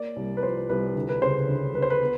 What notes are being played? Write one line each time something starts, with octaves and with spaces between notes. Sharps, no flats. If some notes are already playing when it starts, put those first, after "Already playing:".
Already playing: A#3 D5
C2
B4
F3 C5
C2 B4
D2
B4
C#3 C5
D2
D2 B4
C5
B4
B3